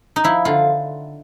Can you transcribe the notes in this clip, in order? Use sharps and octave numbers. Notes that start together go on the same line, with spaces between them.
D#4
F3 E4
D3 F4